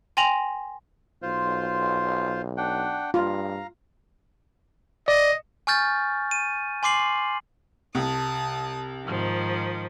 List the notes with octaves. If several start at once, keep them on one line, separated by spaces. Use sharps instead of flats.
G5 G#5 C6 A#6 F7 F#7
B1 F4 C5
D4 F#5 G5
G2 F4 F5 A#5
D5 D#5
G#5 C#6 F6 G6 A6
D#7
G#5 C6 D6 C7 F#7
C2 A5 D#6
G#2 D#3 F3